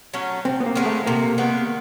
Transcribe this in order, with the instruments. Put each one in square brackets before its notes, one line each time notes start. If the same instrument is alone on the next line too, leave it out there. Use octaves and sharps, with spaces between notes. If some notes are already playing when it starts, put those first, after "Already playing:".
[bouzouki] F#3 A3 C#4
[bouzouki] C3 [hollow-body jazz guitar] C4
[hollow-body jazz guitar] B3
A#3
[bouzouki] D#3 G#3 B3
[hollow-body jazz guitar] A3
[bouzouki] C3 [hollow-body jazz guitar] A#3
[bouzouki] D#3 G#3 B3